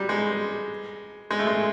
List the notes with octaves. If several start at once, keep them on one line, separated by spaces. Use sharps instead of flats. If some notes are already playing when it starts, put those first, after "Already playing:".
Already playing: F#3 G3
G#3
G#3
A3
G#3